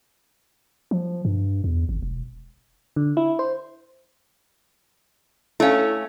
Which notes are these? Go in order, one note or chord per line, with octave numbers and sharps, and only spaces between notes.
F3
G2
E2
G#1
E1
D3
E4
C5
A3 C#4 E4 F5